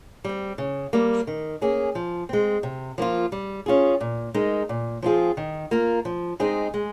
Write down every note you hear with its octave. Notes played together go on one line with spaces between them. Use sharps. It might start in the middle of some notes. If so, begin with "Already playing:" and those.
G3 C4
C#3
G3 A#3
D#3
A#3 C#4 G#4
F3
G#3 C4
C3
F3 A#3 F4
G3
C#4 F4 G#4
A#2
G#3 D#4 A#4
A#2
F3 C4 F4 G#4
D#3
A#3 F4 A#4
F3
G#3 C4 D#4 G#4
G#3